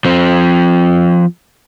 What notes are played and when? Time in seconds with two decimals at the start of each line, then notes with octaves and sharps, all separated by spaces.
0.05 F3 C4